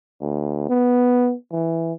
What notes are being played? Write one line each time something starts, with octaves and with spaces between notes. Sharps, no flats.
D2
B3
E3